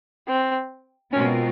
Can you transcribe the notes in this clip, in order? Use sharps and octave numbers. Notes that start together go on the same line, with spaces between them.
C4
B2 G#3 C4 C#4 F4 A#4